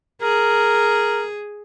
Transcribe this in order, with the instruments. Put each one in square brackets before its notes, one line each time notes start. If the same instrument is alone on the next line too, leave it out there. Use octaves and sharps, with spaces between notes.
[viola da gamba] G#4 [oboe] A#4